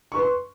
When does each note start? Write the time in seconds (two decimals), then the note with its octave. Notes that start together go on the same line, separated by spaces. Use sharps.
0.12 C#6
0.15 B4
0.19 C6